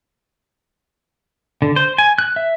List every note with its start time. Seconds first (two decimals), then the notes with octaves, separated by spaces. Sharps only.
1.62 D3
1.76 C5
1.98 G#5
2.18 F#6
2.36 E5